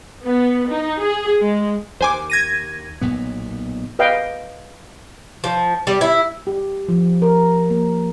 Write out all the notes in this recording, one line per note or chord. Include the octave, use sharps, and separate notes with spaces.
B3
D#4
G#4
G#3
D#2 C5 G#5 D6
G#6 A#6 D#7
B1 A#2 B3
B4 D#5 F5 G5
F3
G3
E4
G4
F3
A#4
A#3